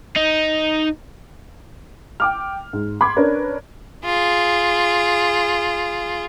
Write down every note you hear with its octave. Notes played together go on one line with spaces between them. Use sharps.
D#4
G5 D6 F6
G#2
B5 C6 D6 G#6
C#4 D4 A#4 B4 C#5
F4 G#4